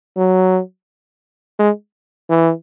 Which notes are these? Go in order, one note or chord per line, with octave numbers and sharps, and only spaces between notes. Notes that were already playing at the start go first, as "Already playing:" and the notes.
F#3
G#3
E3